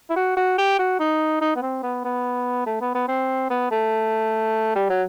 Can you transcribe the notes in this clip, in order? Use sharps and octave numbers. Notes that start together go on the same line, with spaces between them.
E4
F#4
F#4
G4
F#4
D#4
D#4
B3
C4
B3
B3
A3
B3
B3
C4
B3
A3
G3
F#3